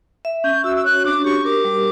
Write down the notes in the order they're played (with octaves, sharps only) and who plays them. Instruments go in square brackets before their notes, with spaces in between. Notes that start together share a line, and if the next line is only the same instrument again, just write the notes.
[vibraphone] E5
[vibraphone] C#4 [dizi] G6
[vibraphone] F#4 [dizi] E6
[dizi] E6
[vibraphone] C#5 [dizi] F#6
[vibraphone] D4 [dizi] D6
[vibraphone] G4 [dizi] C#6
[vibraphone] A#4 [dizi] D6
[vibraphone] G3